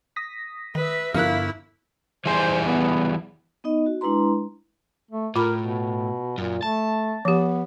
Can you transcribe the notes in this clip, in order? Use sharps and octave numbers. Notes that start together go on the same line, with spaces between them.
D#6 A#6 B6
D#3 B4 E5
G1 G2 F3 E4 A#4 F5 F#6
E3 G3 G#4 C5
B3
B3 D#4 D#5
F#4
G#3 D4 E4 B4 A#5 C6
A3
A2 F4 A#4 B5
B2
F#2 A#2
A3 A5
F3 B3 G4